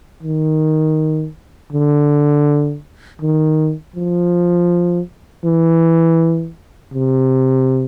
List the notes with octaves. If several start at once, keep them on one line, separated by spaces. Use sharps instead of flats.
D#3
D3
D#3
F3
E3
C3